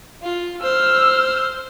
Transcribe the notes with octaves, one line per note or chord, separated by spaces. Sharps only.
F4
C5 E6 F6